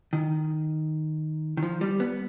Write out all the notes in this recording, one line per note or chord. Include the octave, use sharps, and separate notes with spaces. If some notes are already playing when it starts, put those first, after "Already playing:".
D#3
D#3
F3
G3
B3